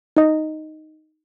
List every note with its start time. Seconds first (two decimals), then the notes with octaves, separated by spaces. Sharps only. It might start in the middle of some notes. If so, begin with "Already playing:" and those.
0.17 D#4 D#5